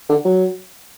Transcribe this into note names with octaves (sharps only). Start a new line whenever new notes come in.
D3
F#3